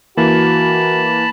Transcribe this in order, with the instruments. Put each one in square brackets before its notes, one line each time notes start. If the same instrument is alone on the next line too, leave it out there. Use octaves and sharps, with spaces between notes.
[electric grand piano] E3 A#3 [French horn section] F#4 [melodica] A5 B5